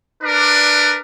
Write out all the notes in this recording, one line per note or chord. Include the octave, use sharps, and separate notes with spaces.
D4 A#4 B4 D5